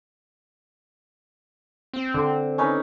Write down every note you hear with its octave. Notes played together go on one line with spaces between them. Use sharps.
C4
D3
C#4 D#4 B4